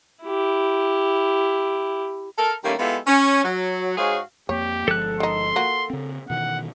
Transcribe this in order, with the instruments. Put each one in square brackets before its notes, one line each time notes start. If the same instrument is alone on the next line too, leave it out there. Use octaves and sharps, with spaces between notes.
[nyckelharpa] E4 G4
[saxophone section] A4 A#4
D#3 G3 A3 A#3 C#4
G#3 B3 E4 F4 G4 A4
C#4
F#3
G#2 G#3 F#4 G#4 C#5 F5
[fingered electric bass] F2 A#3 [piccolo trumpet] G4 [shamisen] C#5
[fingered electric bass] G1 F3 G#3 [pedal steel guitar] A4 F#6
[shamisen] D#3 D#4 [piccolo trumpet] C6
[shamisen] A#3 F4 F#4
[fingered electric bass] C#3 C4
[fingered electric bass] B2 D#3 E3 [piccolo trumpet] F#5